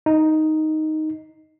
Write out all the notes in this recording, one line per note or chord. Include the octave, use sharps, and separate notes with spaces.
D#4